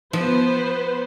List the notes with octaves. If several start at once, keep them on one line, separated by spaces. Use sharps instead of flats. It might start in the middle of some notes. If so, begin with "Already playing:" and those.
F3 B3 B4 C5